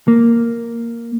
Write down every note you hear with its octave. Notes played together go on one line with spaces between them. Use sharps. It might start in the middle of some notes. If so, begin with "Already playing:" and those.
A#3